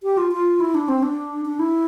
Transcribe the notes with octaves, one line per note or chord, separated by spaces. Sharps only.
G4
F4
F4
E4
D4
C4
D4
D4
E4